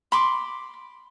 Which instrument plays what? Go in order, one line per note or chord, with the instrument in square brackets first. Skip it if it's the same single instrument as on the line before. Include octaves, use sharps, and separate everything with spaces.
[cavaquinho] B5 C6 D6